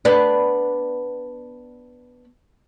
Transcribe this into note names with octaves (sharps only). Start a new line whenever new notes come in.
B3 D4